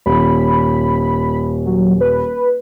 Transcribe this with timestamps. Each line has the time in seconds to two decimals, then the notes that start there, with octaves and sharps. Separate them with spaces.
0.06 D#1 B5
1.65 F#3
2.01 B4